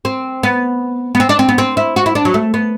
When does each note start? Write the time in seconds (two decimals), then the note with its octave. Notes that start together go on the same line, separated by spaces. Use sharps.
0.05 C4
0.43 B3
1.15 B3
1.20 C4
1.29 D4
1.39 C4
1.49 B3
1.58 C4
1.77 E4
1.96 F#4
2.06 E4
2.15 D4
2.25 F#3
2.34 A3
2.54 B3